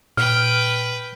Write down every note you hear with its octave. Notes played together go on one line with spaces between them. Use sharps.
A#2 B4 G5 F6